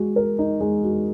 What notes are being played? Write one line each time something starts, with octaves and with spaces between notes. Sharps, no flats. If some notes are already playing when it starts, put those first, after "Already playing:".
Already playing: G#3 F#4
A#4
D#4
G#3
F#4